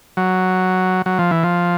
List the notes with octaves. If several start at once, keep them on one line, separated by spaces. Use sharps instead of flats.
F#3
F#3
F3
E3
F3